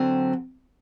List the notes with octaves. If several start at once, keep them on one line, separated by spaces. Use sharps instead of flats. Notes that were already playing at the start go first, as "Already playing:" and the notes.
Already playing: D3 F#3 C4